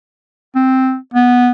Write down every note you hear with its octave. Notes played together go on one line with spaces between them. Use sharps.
C4
B3